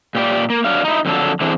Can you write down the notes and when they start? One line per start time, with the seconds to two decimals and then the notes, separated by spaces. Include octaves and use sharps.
0.15 A#2 G4 D5
0.50 A#3
0.64 F#3 D4 F5
0.85 D#4 E4
1.05 F2 D3 F#3 A4
1.41 D3 E3 C4 D4 G#4